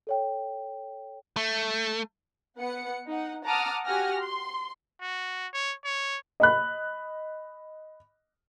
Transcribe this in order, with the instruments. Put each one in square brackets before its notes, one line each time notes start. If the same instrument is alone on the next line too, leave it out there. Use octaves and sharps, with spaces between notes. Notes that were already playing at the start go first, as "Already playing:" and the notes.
[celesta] A4 C#5 G5
[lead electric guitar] A3
[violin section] B3 F#5 C#7
D#4 F#5
F#5 A5 A#5 D6 D#6 F6
F#4 G4 F#5 G#5 F6 A#6
C6
[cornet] F#4
C#5
C#5
[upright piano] D#5 B5 F#6